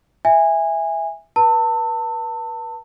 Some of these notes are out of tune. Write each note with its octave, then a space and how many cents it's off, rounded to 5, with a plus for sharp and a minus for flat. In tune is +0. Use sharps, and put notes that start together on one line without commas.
E5 +0 G#5 -20
B4 -30 A5 +30 E6 -20